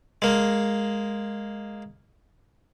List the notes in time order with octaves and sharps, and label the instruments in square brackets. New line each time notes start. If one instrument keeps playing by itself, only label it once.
[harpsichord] G#3 A#3